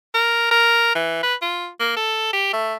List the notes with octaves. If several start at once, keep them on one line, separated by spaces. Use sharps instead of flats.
A#4
A#4
E3
B4
F4
A#3
A4
G4
A3